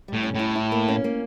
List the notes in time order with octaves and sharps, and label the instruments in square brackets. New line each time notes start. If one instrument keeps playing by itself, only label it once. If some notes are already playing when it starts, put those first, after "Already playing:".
[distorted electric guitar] A2 [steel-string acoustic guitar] G3
[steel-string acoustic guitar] C#4
[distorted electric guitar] A2 [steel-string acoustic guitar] E4
[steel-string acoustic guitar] E4
A#3
C#4
A#3